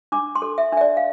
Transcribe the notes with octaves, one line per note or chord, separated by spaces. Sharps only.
D4 D6
C6
A4
E5
D4 E5
D5
F5